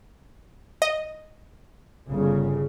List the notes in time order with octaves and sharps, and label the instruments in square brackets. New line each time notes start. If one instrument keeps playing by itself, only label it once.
[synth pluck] D#5
[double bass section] G1 C#3